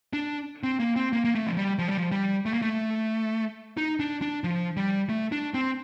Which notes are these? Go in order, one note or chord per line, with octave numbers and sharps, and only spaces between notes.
D4
C4
A#3
C4
A#3
A#3
A3
F3
G3
F3
G3
F3
G3
A3
A#3
A3
D#4
D4
D4
F3
G3
A3
D4
C4